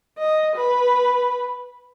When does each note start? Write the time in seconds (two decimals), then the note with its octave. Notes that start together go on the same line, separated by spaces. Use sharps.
0.18 D#5
0.55 B4